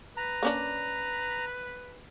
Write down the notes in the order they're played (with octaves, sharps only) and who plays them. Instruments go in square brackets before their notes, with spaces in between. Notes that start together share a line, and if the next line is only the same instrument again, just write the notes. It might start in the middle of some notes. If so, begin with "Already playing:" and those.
[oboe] B4 [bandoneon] A#5
[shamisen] A#3 C#4 D4